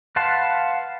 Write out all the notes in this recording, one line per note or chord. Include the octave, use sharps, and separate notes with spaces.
B4 F5 F#5 A5 C6